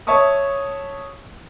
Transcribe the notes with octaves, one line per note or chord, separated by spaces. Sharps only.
C#5 E5 A5 C#6 D#6